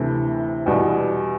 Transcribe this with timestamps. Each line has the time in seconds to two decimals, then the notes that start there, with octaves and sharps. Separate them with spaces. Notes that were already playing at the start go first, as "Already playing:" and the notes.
Already playing: D2 C3 E3 A3 E4
0.66 E2 B2 G3 D4 F#4